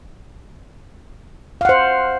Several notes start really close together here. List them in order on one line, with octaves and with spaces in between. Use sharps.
F5 F#5 C5